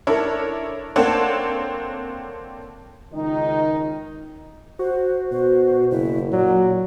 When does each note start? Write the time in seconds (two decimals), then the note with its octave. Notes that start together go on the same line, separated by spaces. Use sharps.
0.07 D4 E4 A4 A#4 C#5
0.96 A#3 C4 D4 A4 C#5 F#5
3.14 C#2 D#3 D#4
4.79 F#4 C5
5.32 B2 C5
5.91 F#1 E4
6.32 A#2 F#3 D5